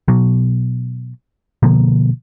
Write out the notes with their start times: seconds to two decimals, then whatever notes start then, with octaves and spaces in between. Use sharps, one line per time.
0.08 B2 F#3
1.63 B2 D3 F3 A#3